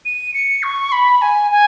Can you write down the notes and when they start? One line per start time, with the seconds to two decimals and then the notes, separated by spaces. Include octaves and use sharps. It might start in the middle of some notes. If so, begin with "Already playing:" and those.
0.05 D#7
0.34 C#7
0.63 C#6
0.92 B5
1.22 G#5
1.51 G#5